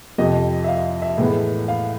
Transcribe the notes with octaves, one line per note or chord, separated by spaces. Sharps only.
F2 C3 F3 D#5
E5
F5
E5
A2 E3 G#3 B3
F5